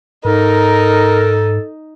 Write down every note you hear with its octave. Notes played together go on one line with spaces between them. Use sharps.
G#2 D#4 A4 A#4